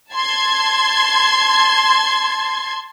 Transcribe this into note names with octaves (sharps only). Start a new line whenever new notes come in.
A5 C6 G#6